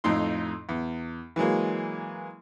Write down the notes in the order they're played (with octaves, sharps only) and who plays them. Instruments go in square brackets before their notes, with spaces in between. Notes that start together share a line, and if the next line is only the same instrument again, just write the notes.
[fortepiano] F2 A2 D#4 C6
E2
E3 F#3 G#3 A#3